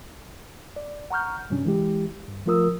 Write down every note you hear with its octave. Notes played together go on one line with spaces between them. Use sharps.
D5
F#5 A#5 C#6 F6 G6
G2 C3 F#3 C#4 D4
E3 G#3 E4 G4
G2
F3 A3 F4 A#4 D#6 E6